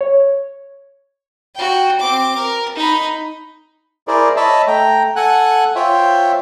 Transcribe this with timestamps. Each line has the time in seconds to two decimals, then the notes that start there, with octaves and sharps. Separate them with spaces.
0.01 C#5
1.55 F#4 G5
1.99 C4 D6
2.36 A#4
2.75 D#4 B5
4.08 E4 G#4 A#4 C5 D5
4.36 C#5 D#5 E5 A5 B5
4.67 A3 G5 A#5
5.16 A4 F#5 G#5 F#6
5.76 F4 C5 C#5 E5 G5